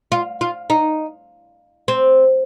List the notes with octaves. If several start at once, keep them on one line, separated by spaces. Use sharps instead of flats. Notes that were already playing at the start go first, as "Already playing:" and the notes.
F4
F4
D#4
C4